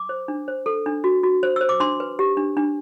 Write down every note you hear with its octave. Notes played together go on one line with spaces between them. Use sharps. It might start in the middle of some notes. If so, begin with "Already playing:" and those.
Already playing: D6
C5
D4
C5
A4
D4
F#4
F#4
C5
C5 E6
D6
D4 C6
B4
G4
D4
D4